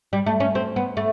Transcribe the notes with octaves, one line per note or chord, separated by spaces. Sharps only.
G3
A3
C#4
C4
B3
A3